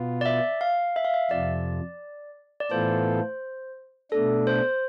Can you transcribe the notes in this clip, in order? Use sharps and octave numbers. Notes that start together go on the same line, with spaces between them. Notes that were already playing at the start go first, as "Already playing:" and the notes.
Already playing: B2 B3 F4
D5
E5
F5
E5
F5
E5
F2 C3 F3 D5
D5
A2 E3 B3 F4 A4 C5
B2 A3 D4 A4
C5